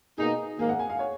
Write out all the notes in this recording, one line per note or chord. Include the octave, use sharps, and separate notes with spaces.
B2 A#3 D#4 G#4
G#2 D#3 A#3 G#4
F#5
G#5
F5
C#5